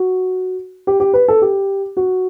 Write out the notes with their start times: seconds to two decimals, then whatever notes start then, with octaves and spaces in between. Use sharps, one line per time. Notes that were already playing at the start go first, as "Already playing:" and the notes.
Already playing: F#4
0.87 G4
1.00 G4
1.13 B4
1.28 A4
1.42 G4
1.97 F#4